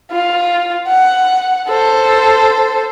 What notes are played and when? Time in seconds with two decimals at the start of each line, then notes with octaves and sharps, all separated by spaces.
0.13 F4
0.88 F#5
1.68 A4 C5